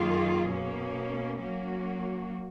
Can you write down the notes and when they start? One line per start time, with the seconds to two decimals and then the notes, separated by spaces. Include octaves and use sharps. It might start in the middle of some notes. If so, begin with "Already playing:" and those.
Already playing: F#2 D#3 A#3 F4 G#4
0.49 B2 A#3 C#4
1.39 F#3 A#3 C#4 F#4